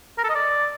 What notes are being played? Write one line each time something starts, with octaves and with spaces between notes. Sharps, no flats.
A#4
A4
D#5
D5